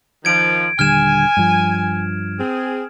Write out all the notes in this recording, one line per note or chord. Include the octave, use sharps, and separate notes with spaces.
D#3 F3 G#6 D7
D#1 D3 G3 G#5 F6 G#6 E7
G2 F3
C4 G#4